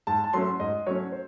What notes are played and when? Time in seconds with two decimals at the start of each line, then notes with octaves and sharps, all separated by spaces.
0.07 G#2 A5
0.24 A5
0.33 F#3 A3 C#4 C6
0.60 G#2 D#5
0.86 F#3 A3 C#4 C#5
1.12 C5